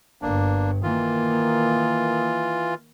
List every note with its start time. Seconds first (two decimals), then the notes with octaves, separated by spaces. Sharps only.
0.22 G1 G2 A#3 D4
0.83 D#3 E3 A#3 F4